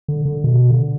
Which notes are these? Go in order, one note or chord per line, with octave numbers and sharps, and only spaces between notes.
D3
D3
B2
D3